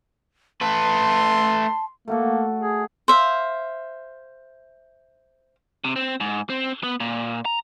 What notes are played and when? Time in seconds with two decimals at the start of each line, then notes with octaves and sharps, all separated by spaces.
0.61 A3 B4 A5 C6
2.08 A3 A#3 F#4 A4
2.60 G#4
3.08 C5 E5 F5
5.84 C3
5.96 C4
6.20 G#2
6.50 C4
6.83 B3
7.00 A#2
7.45 A#5